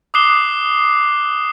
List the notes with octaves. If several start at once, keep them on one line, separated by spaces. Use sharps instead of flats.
D6 D#6 F#6 C7 E7 G7